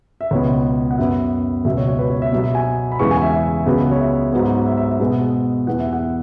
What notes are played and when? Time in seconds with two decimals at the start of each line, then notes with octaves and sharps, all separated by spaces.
0.21 E5
0.31 C#2 B2 B3 C#5
0.91 F#5
0.98 F#2 F#3 B3 E5
1.65 C#2 B2 F#3 E5
1.77 C#5
1.88 C#5
1.99 B4
2.10 C#5
2.22 E5
2.33 B2 F#3 B3 E5
2.44 E5
2.55 G#5
2.92 B5
2.99 E2 C#3 E3 G#3 B3 C#6
3.11 G#5
3.22 E5
3.32 E5
3.66 C#2 C#3 F#3 B3
3.91 C#5
4.00 E5
4.33 G#2 F#3 B3
4.66 E5
4.77 E5
4.90 E5
5.00 B2 G#3 B3
5.67 E2 E3 B3 F#5
5.80 E5
5.93 F#5